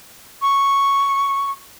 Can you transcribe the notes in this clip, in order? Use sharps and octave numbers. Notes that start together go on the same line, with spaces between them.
C#6